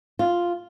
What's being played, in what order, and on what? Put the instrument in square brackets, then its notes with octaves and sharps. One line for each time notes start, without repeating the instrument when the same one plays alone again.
[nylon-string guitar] F4